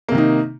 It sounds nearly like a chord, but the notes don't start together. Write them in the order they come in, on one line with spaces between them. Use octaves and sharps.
A#3 C3 D#3 D#4